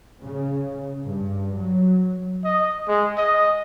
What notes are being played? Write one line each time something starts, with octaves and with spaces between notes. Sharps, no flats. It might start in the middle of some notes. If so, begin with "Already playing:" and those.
C#3
G2
F#3
D#5
G#3
D#5